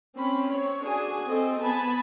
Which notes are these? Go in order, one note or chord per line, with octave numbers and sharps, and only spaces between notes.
C4 C#4 B5
C4 C#5
D4 F#4 G#4 G#5
C4 A4 D#5
B3 G#5 A5 B5